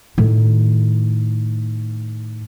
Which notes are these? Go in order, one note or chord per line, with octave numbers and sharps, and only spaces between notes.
A2 D#3